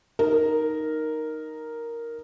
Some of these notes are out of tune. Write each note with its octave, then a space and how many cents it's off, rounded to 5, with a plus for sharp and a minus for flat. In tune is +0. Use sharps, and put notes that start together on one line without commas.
D#4 +0 A#4 +0